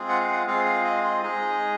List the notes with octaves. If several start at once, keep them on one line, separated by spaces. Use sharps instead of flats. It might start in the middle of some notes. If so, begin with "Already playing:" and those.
Already playing: G#3 C4 F4 G#4
F#5
F5
F#5
G#3 C4 F4 G#4 F5
F5
D#5
D#5
G#3 D#4 G#4 D#5